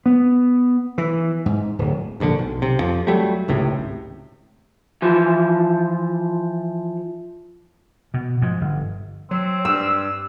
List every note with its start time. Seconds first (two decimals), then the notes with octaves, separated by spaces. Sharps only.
0.06 B3
0.98 E3
1.46 G#2
1.79 D1
2.20 F1 A#1 G#2 D3
2.38 B1
2.62 C3
2.80 F2 F3
3.07 F#3 G3 A3
3.48 G#1 C#2 A2 C3
5.02 E3 F3
8.14 B2
8.42 G#2 F3
8.61 G1
9.31 F#3 C4
9.65 G2 E6